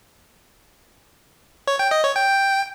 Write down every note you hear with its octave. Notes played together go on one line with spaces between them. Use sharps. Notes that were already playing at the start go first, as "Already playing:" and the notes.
C#5
G5
D#5
C#5
G5